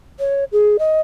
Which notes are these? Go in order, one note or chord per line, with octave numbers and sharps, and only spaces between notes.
C#5
G#4
D#5